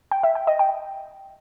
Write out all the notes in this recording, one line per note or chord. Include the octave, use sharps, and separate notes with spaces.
G5
E5
G5
D#5
G5